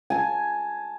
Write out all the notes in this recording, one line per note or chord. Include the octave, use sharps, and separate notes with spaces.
G#5 A5